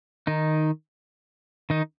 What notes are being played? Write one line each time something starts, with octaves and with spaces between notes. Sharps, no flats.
D#3 D#4
D#3 D#4